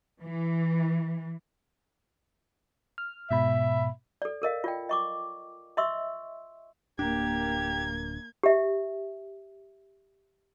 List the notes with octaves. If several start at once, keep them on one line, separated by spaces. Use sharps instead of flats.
E3
F6
G#2 B2 E5 B5
A4 D5
A4 A#4 D#5 F5
F4 D5 G5
D#5 C#6 D6
D#5 E5 C6 C#6 E6
D1 A#3 D4 G4 G#6
G4 E5